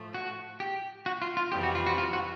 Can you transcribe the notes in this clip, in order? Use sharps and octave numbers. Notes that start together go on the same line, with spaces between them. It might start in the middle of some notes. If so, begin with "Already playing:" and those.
Already playing: A2 F3 A3
F#4
G4
F#4
F4
F4
F2 C3 E3 G3 G4
F#4
F4
F#4
F4
F#4